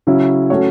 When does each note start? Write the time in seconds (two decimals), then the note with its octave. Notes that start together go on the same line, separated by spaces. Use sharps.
0.07 C#3 F#3 C#4 E4
0.50 F#3 A3 C#4 F#4 C#5